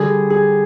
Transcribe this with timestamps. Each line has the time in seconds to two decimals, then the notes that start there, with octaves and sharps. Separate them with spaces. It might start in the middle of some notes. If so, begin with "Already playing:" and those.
Already playing: D3 G3 G#4
0.30 G#4